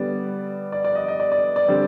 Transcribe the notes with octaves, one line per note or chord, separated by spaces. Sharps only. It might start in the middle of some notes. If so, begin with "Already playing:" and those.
Already playing: D3 G3 B3 D5
D5
D5
D#5
D#5
D5
D5
D5
D3 G3 C4